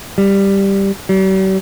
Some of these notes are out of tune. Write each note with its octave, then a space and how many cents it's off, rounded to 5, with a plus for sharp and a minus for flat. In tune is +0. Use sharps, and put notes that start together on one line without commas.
G3 +5
G3 -45